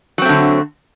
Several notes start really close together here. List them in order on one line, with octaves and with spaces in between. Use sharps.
F#3 C4 A3 D3